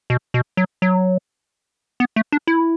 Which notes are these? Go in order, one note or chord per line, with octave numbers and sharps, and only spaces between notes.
B2
B2
F#3
F#3
B3
A3
D4
E4